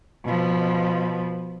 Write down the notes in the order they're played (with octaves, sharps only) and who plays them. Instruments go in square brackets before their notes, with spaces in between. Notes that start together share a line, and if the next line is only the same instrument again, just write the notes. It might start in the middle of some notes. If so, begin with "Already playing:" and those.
[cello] B2 F3